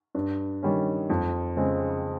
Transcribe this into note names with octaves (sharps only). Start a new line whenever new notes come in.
G2
D#3 G3 C#4
F2
C#3 G#3 C4